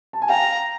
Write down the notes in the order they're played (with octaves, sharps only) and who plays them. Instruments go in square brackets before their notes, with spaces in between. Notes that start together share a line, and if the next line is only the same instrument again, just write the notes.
[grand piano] A5
G#5
[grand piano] F5 G5 [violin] A#5